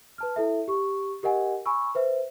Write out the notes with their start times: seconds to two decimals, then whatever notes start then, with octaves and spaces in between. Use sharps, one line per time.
0.18 B4 A5 F6
0.36 E4 A4 E5
0.68 G4 C#6
1.23 G4 A#4 D#5 F#5 G#5
1.66 G#5 B5 C#6 E6
1.95 B4 C5 E5